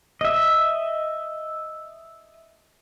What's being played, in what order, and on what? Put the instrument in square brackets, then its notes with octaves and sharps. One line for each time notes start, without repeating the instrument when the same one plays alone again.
[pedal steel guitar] D#5 E5